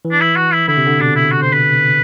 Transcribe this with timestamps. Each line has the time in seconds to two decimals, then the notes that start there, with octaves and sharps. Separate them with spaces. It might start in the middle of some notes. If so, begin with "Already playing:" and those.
0.05 E3
0.11 D4
0.21 E4
0.36 F#4
0.52 E4
0.68 D3 E4
0.77 C3
0.87 D3
0.99 B2 D4
1.16 E4
1.31 F#4
1.42 C5
1.53 B4